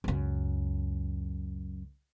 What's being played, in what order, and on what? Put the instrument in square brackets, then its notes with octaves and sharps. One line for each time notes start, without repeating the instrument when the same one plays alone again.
[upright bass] C#2 F#2